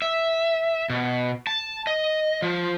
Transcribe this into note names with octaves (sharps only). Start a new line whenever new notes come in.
E5
B2
A5
D#5
F3